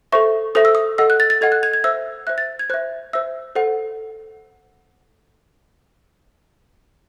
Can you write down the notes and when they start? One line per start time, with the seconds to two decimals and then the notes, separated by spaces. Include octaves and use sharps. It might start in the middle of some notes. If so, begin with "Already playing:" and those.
0.12 A4 C5 E5 C#6
0.55 A4 C5 E5 D#6
0.65 E6
0.75 D#6
0.98 A4 D#5 F#5 E6
1.10 F#6
1.20 A6
1.30 A6
1.41 A4 D#5 F#5 G#6
1.52 F#6
1.63 G#6
1.73 G#6
1.84 C5 E5 E6
2.27 C5 E5 F#6
2.38 A6
2.59 G#6
2.70 C5 E5 F#6
3.13 C5 E5 E6
3.55 A4 C5 F#5